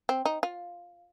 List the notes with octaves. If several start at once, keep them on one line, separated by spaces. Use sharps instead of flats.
C4
D#4
F4